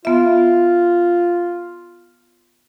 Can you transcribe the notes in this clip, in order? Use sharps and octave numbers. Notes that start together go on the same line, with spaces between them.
B3 F4 E5